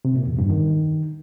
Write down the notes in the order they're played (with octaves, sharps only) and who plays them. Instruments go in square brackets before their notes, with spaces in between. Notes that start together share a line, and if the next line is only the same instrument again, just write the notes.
[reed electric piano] C3
A#2
E2
G2
D#3